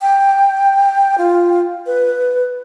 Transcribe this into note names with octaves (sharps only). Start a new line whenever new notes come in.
G5
F4
B4